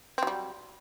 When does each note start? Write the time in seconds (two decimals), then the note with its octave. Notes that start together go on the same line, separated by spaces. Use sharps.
0.18 C4
0.23 F#3
0.27 G3